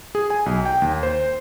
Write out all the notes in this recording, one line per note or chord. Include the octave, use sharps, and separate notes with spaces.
G#4
G#5
B1
G5
D#2
C5